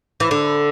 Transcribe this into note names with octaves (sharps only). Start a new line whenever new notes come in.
E3
D3